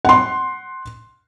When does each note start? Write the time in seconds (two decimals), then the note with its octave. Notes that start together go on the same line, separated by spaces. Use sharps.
0.05 F#5 C6